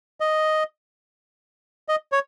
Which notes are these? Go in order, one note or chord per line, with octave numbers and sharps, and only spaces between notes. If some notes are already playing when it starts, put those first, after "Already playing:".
D#5
D#5
C#5